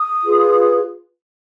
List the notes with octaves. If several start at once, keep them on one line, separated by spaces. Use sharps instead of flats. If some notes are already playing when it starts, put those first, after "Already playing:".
Already playing: D#6
F4 G#4 B4
D#6